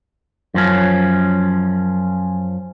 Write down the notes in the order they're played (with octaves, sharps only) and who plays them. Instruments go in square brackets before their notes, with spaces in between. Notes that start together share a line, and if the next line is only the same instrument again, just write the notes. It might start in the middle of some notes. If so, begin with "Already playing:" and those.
[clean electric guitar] F#2 F3 C#4